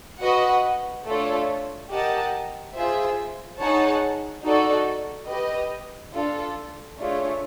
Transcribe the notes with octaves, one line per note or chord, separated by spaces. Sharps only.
F#4 B4 D#5 F#5
A3 D4 F4 A4 C#5
G4 A#4 D#5 F#5 A5
F4 G#4 C5 E5
D#4 G#4 C#5 F#5 A5
D#4 F#4 A4 D5
G4 B4 D#5
D4 F4 A4
A3 D4 F4 G#4 C#5